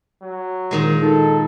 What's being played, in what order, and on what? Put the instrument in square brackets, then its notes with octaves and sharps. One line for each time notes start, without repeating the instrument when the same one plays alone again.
[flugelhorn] F#3
[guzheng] A#2 D#3 G#3
[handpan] D#4 [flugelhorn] A4